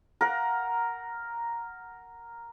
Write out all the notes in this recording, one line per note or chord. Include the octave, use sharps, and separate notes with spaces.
A#4 F#5